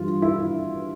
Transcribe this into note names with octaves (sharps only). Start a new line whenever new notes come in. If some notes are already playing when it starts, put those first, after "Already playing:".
Already playing: G2 E3 F4
E4